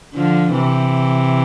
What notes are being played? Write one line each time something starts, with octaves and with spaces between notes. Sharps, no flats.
D3 F3
C3 E3